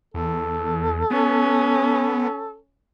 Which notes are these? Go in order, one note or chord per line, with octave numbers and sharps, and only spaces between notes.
E2 A4
B3 C#4